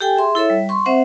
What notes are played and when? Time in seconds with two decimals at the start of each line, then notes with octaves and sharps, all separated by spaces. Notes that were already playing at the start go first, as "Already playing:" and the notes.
0.01 G4 A4 G5 G#5
0.16 G#4 E5 C6
0.35 E4 A4 C#5 E5
0.50 G3
0.69 C6 C#6
0.85 C4 C5 E5 F#5